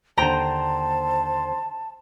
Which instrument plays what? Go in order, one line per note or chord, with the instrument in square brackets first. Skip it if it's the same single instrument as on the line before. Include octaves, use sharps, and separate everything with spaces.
[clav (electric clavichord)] D#2 D3 [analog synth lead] C5 [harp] G5 A#5 [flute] A5